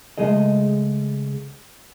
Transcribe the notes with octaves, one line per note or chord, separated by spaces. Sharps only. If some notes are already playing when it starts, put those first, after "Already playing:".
C#2 G#3 A3 G#4 D#5